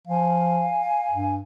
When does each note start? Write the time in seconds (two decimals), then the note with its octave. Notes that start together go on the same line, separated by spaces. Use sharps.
0.07 F3 F5 G#5
1.10 G2